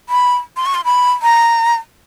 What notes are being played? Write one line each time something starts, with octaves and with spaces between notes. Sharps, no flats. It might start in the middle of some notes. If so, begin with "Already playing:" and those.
B5
C6
C#6
C6
B5
A#5